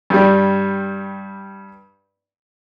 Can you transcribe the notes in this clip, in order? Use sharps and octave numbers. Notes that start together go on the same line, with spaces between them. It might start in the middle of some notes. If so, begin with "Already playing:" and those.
G2 G3